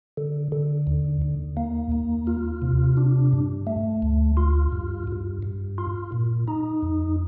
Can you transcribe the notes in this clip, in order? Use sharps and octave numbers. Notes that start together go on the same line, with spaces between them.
D3
D3
D#2
D#2
A#3
D#2
F4
C3
D4
G2
A3
D2
F4
G2
G2
G2
F4
A#2
D#4
F2